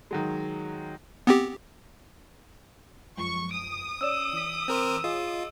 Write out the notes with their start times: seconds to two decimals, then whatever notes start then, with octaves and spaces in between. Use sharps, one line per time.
0.11 D#3 F#3 G#3
1.27 B3 C4 G4
3.17 F#2 F3 G#3 C#6
3.51 D#6 D7
4.01 C#4 C#5 D5 E6 E7
4.33 E3 B6
4.68 C4 A#4 C5
5.04 F4 G#4 C#5 D#5